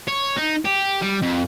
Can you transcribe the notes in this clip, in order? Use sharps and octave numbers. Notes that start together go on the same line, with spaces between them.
C#5
D#4
G4
G3
F2